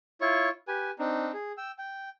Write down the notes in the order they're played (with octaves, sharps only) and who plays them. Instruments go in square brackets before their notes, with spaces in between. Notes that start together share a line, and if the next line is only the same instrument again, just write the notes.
[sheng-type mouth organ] E4 F4 C#5 C#6
G4 B4 G#5
C4 D4 D#4
G#4
G5 E6
G5